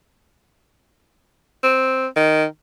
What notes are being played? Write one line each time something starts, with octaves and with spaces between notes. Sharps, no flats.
C4
D#3